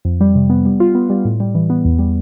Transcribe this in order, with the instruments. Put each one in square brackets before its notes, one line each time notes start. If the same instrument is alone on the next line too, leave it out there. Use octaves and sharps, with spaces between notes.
[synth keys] F2
G3
C3
B3
G3
F4
B3
G3
A2
G3
E3
B3
E2
G3